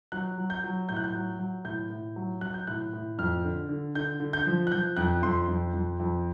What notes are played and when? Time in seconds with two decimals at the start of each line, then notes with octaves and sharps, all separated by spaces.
0.12 F#3 F#6
0.38 F#3
0.50 G6
0.64 F#3
0.89 A2 G6
0.96 F#6
1.04 G6
1.14 F#3
1.39 F#3
1.65 A2 G6
1.90 A2
2.16 F#3
2.41 F#3 F#6
2.54 G6
2.67 A2 F#6
2.93 A2
3.18 F2 F6
3.44 D3
3.69 D3
3.95 D3 G6
4.20 D3
4.33 G6
4.46 F3
4.67 F#6
4.72 F3 G6
4.97 F2 F#6
5.22 F2 C6
5.48 F2
5.73 F2
6.00 F2